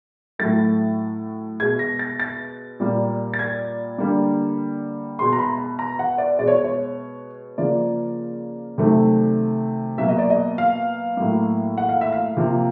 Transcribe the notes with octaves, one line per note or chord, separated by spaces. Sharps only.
A2 F#3 A3 A6
B2 G#3 G#6
A#6
A6
A6
A#2 G3 A#3
A6
G#6
D3 G3 A#3
B2 G#3 C6
A#5
B5
B5
A#5
F#5
D5
B2 G#3 D5
C#5
C#5
C#3 F3 A#3 D5
C3 D#3 F#3 A3
B2 F#3 A#3 E5
D#5
D5
D#5
F5
A2 F#3 A#3
F#5
F5
E5
F5
C3 F3 A#3